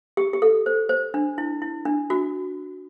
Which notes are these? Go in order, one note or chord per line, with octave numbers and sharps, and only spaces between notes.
G4
G4
A4
C5
C5
D4
E4
E4
D4
F#4